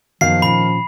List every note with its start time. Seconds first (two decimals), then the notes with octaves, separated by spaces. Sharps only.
0.21 F#2 D#3 F3 B3 F#4 F5 C7
0.42 A#2 C#4 F4 B5